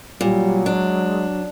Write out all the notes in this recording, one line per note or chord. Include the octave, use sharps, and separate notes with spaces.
A#2 F#3 G3
G#3 D4